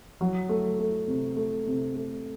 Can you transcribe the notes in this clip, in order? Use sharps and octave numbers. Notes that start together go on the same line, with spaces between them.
F#3
A3
A3
C3
A3
C3
A3